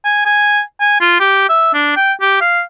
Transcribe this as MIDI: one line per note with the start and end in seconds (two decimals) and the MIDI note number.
0.05 0.23 80
0.25 0.61 80
0.80 0.99 80
1.00 1.18 65
1.20 1.45 67
1.49 1.73 76
1.74 1.93 62
1.96 2.13 79
2.21 2.40 67
2.41 2.62 77